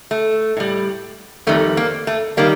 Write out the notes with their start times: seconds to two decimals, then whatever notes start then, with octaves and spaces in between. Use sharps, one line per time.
0.11 A3
0.57 A2 G3
1.47 F2 D#3 G3 A3
1.77 A#3
2.07 A3
2.37 D#3 G3 A#3